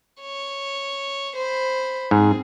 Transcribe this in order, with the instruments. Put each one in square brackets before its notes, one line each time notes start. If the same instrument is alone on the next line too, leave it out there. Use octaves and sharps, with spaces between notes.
[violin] C#5
C5 B5
[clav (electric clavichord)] G#2 [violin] C4 G#4